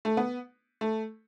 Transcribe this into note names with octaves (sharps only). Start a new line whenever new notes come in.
A3
B3
A3